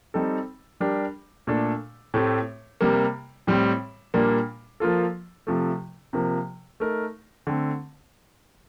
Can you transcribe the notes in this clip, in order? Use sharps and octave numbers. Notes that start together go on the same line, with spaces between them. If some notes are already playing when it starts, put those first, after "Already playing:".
G3 C4 D#4 A4
G3 D4 G4 A#4
A#2 A3 D4 A4
A2 A3 C4 G4
C3 G3 A#3
A2 G3 C4
A#2 G3 A#3 D4
F3 A#3 F4 A4
C3 F3 A3
C3 F3 A#3
A3 D#4 A#4
D3 A3 C4